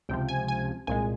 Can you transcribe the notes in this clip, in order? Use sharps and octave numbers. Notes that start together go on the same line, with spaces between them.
C#2 C3 F3 G5
G#5
G#5
C2 A#2 G#3 G#5